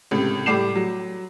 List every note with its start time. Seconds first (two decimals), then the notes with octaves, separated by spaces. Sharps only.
0.11 C#2 A2 C3
0.46 A2 G3 D6 C7 E7
0.75 F#3